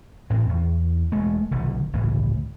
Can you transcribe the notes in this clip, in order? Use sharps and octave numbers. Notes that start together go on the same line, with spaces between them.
A1 A2 C4
E2
E1 G#3 A3
F1 B1 D3 D#3
G1 C#2 A2 E3